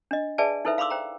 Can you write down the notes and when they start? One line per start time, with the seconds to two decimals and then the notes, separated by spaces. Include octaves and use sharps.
0.11 D4 D#5
0.38 G#4 B4 D5 E5 G#5 A5
0.65 D#4 E4 A4 B4 C5 E5
0.78 F5 B5 C6 D6 E6
0.90 C5 G5 A#5